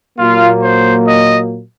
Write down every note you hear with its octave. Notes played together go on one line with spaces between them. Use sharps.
A#2 F#3 A#3 F4
C5
D#5